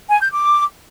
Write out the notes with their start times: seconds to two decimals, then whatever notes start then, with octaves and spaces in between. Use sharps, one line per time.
0.09 G#5
0.21 G6
0.32 D6